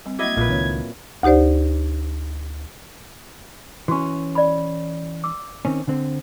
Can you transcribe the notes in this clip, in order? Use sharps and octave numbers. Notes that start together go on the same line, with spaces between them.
G3 C4
F#3 A#3 E4 D#5 D6 G#6
A#1 A#2 B4
C#2 D#3 C4 C#5
D2 D#4 G4 C5 D5
E3 C#4 F#4 C#6
D5 B5
D6 E6
D#3 C4 C#4
D3 C4